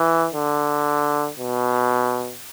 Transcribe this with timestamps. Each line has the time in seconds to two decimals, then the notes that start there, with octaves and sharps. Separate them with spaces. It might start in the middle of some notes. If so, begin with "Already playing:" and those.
Already playing: E3
0.34 D3
1.39 B2